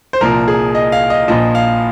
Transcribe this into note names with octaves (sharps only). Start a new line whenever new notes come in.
C5
C2 A#2 F3 A#4
G#4
D#5
F5
D#5
A#1 A#2 F3 D#5
F5